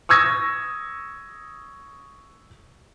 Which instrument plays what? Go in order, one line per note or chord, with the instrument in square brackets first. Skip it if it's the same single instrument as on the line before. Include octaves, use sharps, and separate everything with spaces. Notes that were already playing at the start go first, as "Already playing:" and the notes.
[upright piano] C#6 D#6 E6 G#6 A#6